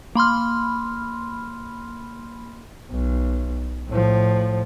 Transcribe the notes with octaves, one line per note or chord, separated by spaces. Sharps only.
A#3 B5 C6 F6
B1
A2 F3